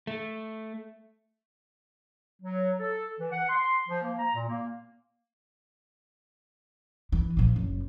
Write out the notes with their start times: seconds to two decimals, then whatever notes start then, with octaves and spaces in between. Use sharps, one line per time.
0.07 A3
2.42 F#3
2.80 A4
3.19 E3
3.32 F#5
3.49 C6
3.89 F3
4.04 A#3
4.19 A#5
4.35 A#2
4.49 A#3
7.12 E3
7.37 A#2 F3
7.56 F#1